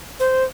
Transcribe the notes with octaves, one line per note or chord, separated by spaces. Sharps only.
C5